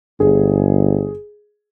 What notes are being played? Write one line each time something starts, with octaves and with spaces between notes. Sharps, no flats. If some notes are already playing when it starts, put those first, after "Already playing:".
G1 G#4